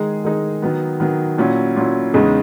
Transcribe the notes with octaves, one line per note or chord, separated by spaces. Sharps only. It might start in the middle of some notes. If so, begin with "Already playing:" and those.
Already playing: D#3 G#3 D#4 G#4
D#3 G#3 D#4 G#4
D#3 F#3 B3
D#3 F#3 B3
A#2 F#3 C#4 E4
A#2 F#3 C#4 E4
E2 C#3 G#3 D#4 G#4